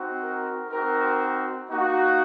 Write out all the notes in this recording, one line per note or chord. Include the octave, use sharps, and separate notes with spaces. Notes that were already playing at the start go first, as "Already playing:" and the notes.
Already playing: C4 D#4 F#4
A#4
C4 D#4 F#4 A#4
A#3 D#4 F#4